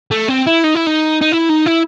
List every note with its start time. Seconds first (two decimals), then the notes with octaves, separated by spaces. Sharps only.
0.11 A3
0.28 C4
0.46 E4
0.64 D#4
0.75 E4
0.86 D#4
1.21 D#4
1.32 E4
1.50 D#4
1.66 E4